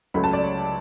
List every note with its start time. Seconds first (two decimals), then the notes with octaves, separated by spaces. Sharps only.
0.14 C#2 C#3 F#3 A3 B5
0.24 A5
0.33 D5
0.43 C#5